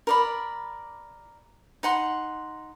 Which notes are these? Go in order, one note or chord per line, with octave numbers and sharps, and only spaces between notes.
A#4 D5 B5
D#4 F#5 C6